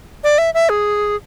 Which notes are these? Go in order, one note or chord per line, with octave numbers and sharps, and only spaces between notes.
D5
E5
E5
G#4